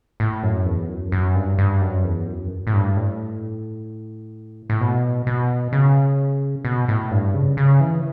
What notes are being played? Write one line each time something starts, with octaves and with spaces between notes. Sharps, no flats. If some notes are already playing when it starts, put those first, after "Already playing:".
A2
F#2
E2
F#2
F#2
G2
G2
F#2
E2
F#2
A2
G2
A2
A2
B2
B2
C#3
B2
A2
G2
C#3
C#3
E3